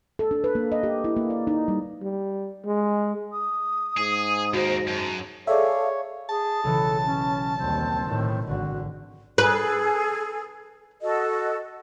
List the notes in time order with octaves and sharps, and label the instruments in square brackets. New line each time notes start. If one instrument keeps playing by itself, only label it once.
[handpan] A4
D4
B4
A#3
D#5
G4
E4
A#3
D5
D#4
G3
[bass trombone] G3
G#3
[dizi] D#6
[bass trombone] G#2 [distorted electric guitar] G#4
[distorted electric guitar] D#2 A#3 [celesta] F#4 [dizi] C5
[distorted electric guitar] F#2 [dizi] A5
[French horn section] G#4 A4 [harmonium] C#5 [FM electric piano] D5 E5 [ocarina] F5
[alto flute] G#4 [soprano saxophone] A5
[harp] B1 C#3 E3 [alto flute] A4
[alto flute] C#4
[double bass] D#2 G3 [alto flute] C4
[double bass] A2 D#3 [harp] G6
[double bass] G#1 D3 [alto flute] F#4
[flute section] G#4 A4 [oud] B4
[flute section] F#4 A4 D#5